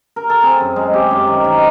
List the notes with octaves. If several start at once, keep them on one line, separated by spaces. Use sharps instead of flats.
A#4
A4
C4 G#4
F#2
G#3
C4 G4
F#2
D#3
D#3